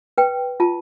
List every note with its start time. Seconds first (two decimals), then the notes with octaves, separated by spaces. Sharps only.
0.18 B4 G5
0.60 F4 A5